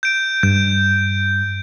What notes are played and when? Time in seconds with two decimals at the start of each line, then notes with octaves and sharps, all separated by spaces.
0.03 G6 D7
0.43 G2 G6